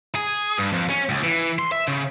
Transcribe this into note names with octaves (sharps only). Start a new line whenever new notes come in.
G#4
G2
F2
C#4
C#2
E3
C6
E5
C#3